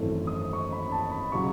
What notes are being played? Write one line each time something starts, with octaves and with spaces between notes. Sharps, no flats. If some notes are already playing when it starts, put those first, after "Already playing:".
Already playing: G#1 F#2 E3 A3
D#6
C#6
B5
A5
B5
C#3 F#3 C#6